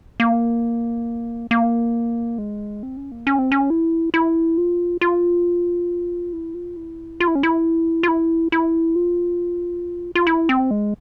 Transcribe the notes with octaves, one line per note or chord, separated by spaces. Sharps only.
A#3
A#3
G#3
C4
C#4
A#3
C#4
C4
C#4
E4
E4
F4
F4
E4
F4
E4
F4
E4
C#4
E4
F4
E4
E4
F4
F4
E4
C4
G#3